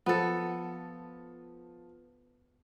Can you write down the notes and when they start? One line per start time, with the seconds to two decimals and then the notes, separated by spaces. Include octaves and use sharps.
0.06 F3 B3 A4